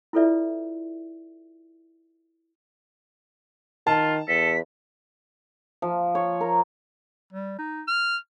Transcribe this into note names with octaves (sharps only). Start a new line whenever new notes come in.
E4 F4 A4 B4 D5 E5
D#3 F4 A5
E2 A4 B6
F3
C#5
A#4
G3
D#4
F6